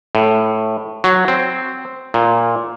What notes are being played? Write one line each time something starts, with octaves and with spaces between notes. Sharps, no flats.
A2
F#3
C4
A#2